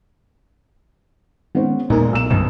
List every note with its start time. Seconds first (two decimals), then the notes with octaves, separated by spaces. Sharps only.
1.55 D#3 G#3 B3 C#4 C5
1.90 E2 A#2 G#3 D#4 A#4
2.11 B1 E6 E7
2.30 G1 C2 F#2 B2 D#3 E3